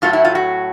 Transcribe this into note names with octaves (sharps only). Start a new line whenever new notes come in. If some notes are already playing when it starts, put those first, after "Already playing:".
A2 F#3 A3 F4
E4
F4
F#4